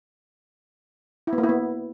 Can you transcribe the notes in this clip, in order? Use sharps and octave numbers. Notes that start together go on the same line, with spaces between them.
E4
B3
A#3
E4
B3